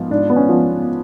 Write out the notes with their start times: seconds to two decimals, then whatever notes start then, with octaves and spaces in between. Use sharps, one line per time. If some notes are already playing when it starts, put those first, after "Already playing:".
Already playing: G#2 F3 B3 F4
0.11 G#2 D4
0.30 B3
0.36 C#4
0.49 F3 B3